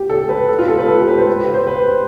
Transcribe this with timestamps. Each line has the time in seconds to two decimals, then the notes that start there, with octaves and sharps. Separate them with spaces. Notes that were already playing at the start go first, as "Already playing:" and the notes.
Already playing: G4
0.10 A4
0.29 B4
0.49 A4
0.58 F4
0.68 A4
0.78 B4
0.88 A4
0.98 G4
1.08 B4
1.18 C5
1.27 B4
1.40 G4
1.54 C5
1.67 B4